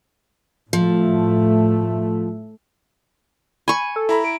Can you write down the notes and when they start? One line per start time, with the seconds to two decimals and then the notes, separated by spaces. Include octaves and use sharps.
0.73 A2 F3 A3
3.68 G#5 B5 C#6
3.96 A4
4.09 E4 A#5 B5
4.24 D7